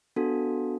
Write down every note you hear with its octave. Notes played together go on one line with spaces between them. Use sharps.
B3 D4 F#4 A4